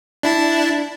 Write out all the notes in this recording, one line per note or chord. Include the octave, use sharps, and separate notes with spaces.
D4 E4 A5